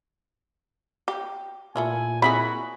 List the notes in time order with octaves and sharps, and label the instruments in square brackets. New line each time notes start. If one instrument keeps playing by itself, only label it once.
[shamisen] G4
[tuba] A#2 [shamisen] A3 E4 F4 [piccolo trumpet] G#5
[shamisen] C4 E4 G#4 [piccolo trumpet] F#4 [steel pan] B5